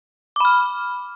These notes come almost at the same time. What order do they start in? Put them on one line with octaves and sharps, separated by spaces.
D6 B5 F6